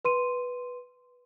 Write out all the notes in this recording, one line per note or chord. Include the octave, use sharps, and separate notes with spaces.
B4 C6 D#7